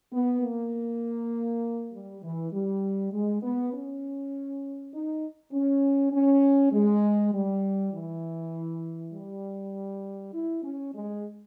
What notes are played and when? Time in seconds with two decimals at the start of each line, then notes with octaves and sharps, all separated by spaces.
0.12 B3
0.41 A#3
1.92 G3
2.23 E3
2.52 G3
3.12 G#3
3.42 B3
3.72 C#4
4.93 D#4
5.52 C#4
6.12 C#4
6.72 G#3
7.32 G3
7.92 E3
9.12 G3
10.33 E4
10.63 C#4
10.93 G#3